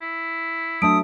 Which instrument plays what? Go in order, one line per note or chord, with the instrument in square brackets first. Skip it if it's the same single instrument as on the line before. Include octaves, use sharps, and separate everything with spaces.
[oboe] E4
[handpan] F#3 A3 E5 [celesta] D4 A5 D7 [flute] D#6